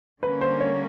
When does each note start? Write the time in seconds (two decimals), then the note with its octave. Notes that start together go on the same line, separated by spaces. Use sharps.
0.22 D3 G3 A#3 C#4 B4
0.41 C5
0.60 C#5